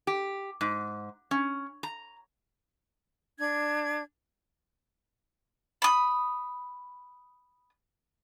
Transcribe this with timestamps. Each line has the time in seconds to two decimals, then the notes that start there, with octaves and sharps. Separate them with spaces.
0.07 G4
0.61 G#2
1.31 C#4
1.83 A#5
3.38 D4 G#6
5.82 B5 D#6